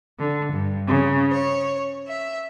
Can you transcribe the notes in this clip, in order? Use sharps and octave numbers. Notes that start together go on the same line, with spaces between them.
D3
G2
C#3
C#5
E5